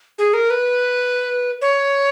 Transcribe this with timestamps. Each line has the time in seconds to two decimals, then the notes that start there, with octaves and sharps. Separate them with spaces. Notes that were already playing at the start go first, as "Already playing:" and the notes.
0.18 G#4
0.34 A#4
0.50 B4
1.62 C#5